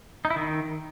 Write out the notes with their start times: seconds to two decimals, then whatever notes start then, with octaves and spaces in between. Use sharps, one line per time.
0.25 D#4
0.30 E4
0.36 D#3